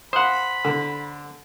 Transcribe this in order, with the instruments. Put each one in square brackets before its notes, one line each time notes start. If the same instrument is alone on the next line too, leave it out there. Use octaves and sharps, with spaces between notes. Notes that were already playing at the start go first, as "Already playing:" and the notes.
[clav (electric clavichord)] C5 F#5 [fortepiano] F5 D#6 [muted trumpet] B5
[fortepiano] D3